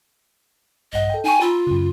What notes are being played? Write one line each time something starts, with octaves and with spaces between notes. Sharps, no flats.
A#1 G2 D#5 F#5
A4 G5
D#4 G5 G#5 C#6
F4 A#5 B5 E6
F#2 C#3